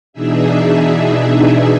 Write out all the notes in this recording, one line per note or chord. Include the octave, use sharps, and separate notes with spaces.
B2 E3 D4 D#4 G#4 E5